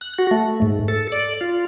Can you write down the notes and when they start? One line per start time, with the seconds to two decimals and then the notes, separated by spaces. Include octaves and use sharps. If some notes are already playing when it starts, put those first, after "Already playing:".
0.01 F#6
0.18 F#4
0.31 A3
0.62 G#2
0.88 A4
1.12 D5
1.41 F4